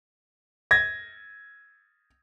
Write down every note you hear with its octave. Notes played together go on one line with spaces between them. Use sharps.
G#6 A#6